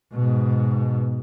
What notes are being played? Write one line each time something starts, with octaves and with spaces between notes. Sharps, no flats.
G#2 B2